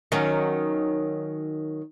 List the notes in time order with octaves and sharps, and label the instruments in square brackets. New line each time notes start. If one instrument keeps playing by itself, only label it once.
[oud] D#3 F#3 C#4